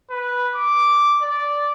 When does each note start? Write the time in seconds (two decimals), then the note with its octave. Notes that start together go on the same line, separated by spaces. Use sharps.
0.10 B4
0.56 D6
1.22 D5